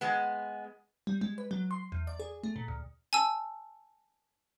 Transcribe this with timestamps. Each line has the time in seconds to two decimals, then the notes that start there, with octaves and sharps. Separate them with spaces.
0.01 G#3 B3
1.07 G3
1.21 G#3
1.38 B4
1.51 F#3
1.71 C6
1.92 E2
2.07 D5
2.20 G#4
2.44 A3
2.56 A#2
2.68 D2
3.13 G#5 A5 E6